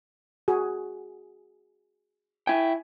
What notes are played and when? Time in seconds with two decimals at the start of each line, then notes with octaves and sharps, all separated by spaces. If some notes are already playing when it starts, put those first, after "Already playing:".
0.48 F#4 G#4
2.47 E4 G5 G#5